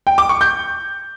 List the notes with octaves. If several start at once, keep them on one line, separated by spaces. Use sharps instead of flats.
G5
D6
C#6
G6